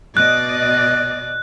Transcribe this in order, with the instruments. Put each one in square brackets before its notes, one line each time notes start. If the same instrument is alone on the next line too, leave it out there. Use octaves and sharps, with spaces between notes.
[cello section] B2 D5 D#5 [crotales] F#6